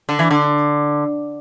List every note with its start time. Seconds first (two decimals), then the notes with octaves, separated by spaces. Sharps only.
0.09 D3
0.19 E3
0.31 D3